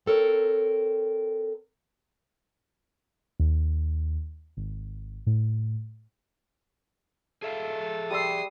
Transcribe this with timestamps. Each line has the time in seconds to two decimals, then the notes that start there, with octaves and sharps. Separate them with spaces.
0.06 C4 A4 A#4 C#5
3.40 D#2
4.57 G#1
5.26 A2
7.42 G#4 A4 E5 F5
8.11 G3 C6 D#6 E6 C7